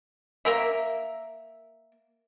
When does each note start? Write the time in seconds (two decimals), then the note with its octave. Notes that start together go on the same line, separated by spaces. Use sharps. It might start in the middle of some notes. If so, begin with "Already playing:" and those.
0.45 A#3 A#4 E5